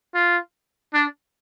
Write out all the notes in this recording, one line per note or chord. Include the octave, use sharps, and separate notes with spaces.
F4
D4